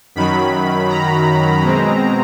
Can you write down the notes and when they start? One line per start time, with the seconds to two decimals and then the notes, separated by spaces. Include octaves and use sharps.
0.15 F#2 D#3 F#3 B5
0.89 A#5
1.62 B2 G#3 C4